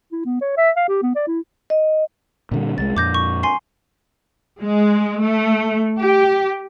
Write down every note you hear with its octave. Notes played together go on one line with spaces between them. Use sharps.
E4
B3
C#5
E5
F5
G4
B3
D5
E4
D#5
A#2 D3 G3
C2 E3 G#3 A6
F2 A#2 D6 G6 A#6
C#6
G#5 C6 C7
G#3
A3
G4